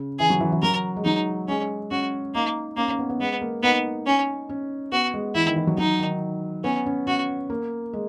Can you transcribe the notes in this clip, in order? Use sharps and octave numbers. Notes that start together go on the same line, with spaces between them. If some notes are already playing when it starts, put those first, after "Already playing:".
Already playing: C#3
E3 G#4
F#3
E3
E3
F#3 A#4
G#3
F#3 D#4
G#3 C#4
C#4 F#4
A#3 D#4
A#3 C#4
C#4
B3
B3
G#3 B3
A#3
B3 D#4
C#4
C#4
B3 F#4
G#3
E3 E4
D#3
E3
F#3
F#3 D#4
D#3
B3 C#4
C#4
C#4 F#4
A#3
G#3